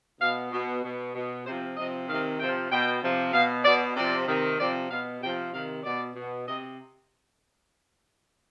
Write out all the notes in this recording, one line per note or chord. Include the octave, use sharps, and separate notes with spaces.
B2 F5
B2
B2
B2
C3 F3 C5
C3 F3 D#5
C3 D#3 F5
C3 F3 G5
B2 G5
C3 F3
B2 F5
B2 D5
C3 F3 D5
C3 D#3
C3 F3 D5
B2 F5
C3 F3 G5
C3 D#3 F5
B2 D5
B2
C3 D#5